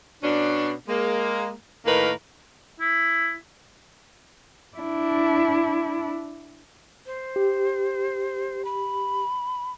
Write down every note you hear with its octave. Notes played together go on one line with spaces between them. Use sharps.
B2 C#4 D4
G#3 A#3
A2 D#3 A#3 A#4 B4
E4
D4 E4
C5
G4
B5